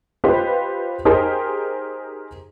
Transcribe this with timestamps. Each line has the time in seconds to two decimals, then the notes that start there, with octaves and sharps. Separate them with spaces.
0.24 F4 G4 B4 C5 D#5
1.05 D#4 G4 G#4 A#4 C5 D#5